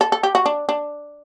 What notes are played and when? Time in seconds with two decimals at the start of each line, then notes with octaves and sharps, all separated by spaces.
0.01 A4
0.12 A4
0.23 G4
0.35 F#4
0.46 D4
0.69 D4